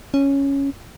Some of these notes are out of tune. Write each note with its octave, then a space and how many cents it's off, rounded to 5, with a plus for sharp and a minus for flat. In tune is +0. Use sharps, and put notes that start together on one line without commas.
C#4 +0